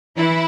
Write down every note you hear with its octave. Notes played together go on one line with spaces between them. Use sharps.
E3 E4